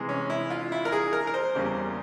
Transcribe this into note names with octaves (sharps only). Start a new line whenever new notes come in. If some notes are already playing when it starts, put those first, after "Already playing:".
Already playing: C3 E3 G#3
C#4
E4
F4
E4
A#4
G#4
A#4
A#4
C5
E2 C#3 G3 A#3